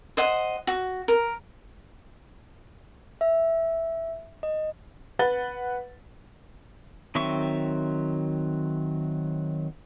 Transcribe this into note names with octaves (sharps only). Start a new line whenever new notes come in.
C5 D#5 F#5
F#4
A#4
E5
D#5
B4 F#5 A6 G7
D#3 F#3 C4 E5 C#6